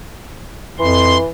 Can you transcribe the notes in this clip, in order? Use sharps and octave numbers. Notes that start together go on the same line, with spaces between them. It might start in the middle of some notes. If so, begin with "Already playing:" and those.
F2 E3 C6